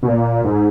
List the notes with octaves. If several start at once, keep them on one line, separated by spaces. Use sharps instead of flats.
B2
A#2
G#2